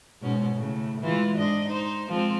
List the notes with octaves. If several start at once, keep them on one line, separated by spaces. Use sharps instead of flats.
G#2 B2 C#4
A2 C#3
E3 G#3 F4
G#2 D4 D#5
D#4 C5
F3 G#3 C4